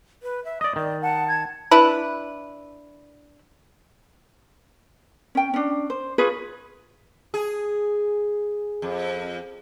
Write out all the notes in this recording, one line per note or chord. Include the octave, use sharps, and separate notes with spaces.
B4
E5
D5 D#5 D#6
D#3 D5
F#5 A5
G#6
D4 E4 B4
C#4 G5
C#4 D4
C5
F4 G#4 B4 C#5
G#4
F2